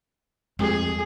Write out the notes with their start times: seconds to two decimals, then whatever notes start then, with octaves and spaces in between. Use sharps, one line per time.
0.59 F2 G#3 G#4